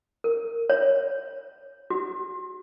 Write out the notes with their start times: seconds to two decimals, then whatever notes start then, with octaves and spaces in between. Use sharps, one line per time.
0.24 A#4
0.70 C#5
1.90 F#4